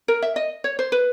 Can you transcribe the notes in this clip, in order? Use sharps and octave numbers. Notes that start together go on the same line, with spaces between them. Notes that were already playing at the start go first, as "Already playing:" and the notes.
A#4
E5
D#5
C#5
C5
B4